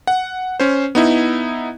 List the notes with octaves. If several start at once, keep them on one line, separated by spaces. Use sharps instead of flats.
F#5
C#4 C5
B3 D#4 E4